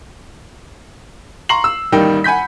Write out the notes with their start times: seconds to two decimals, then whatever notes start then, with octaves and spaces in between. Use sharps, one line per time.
1.49 A#5 C6 C#6 C7 F#7
1.64 E6
1.92 A1 D#3 G3 A#3 D#4 G5
2.24 F#5 G#5 B5 G6 B6